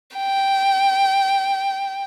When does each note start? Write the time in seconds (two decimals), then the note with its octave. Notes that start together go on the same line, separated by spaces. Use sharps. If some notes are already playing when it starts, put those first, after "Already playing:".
0.16 G5